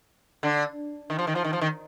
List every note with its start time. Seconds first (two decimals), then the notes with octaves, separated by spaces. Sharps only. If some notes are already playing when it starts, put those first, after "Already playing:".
0.43 D3
1.10 D#3
1.19 F3
1.27 D#3
1.35 F3
1.44 D#3
1.53 F3
1.61 D#3